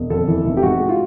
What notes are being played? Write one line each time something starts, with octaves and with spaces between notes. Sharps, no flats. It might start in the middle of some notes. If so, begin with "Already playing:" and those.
Already playing: E1
F2 A4
E3
F1
G4
G#2 F#4
G#3
F4